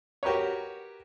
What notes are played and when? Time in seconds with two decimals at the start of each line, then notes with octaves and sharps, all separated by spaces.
0.23 F#4 G4 A#4 B4 C#5